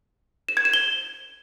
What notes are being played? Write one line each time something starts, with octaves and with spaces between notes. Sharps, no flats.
E7
G#6
E7
G7